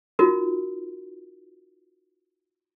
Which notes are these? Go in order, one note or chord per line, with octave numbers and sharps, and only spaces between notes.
D#4 F4 F#4 A#4